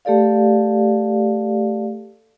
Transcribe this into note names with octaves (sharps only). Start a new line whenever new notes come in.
A3 G4 A4 D5 F5